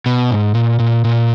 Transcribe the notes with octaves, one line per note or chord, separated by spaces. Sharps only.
B2
G#2
A#2
A#2
A#2